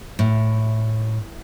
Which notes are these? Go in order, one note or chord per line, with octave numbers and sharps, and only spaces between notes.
A2